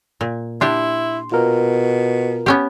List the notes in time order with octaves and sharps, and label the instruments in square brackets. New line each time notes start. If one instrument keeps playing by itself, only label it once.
[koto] A#2
[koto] D4 G4 [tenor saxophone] E4 [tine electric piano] C6
[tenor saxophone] B2 [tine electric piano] F4 A#4
[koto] B3 C#4 G4